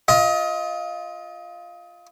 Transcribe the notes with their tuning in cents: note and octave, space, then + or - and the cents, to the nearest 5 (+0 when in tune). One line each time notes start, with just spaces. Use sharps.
F4 +0 D#5 +30